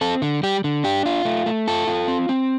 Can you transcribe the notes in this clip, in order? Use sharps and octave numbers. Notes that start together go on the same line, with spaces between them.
C4 A4
D3
G3 G4
D3
D4 G4
F4
A3
A3
F4 A4
F4
C4
C4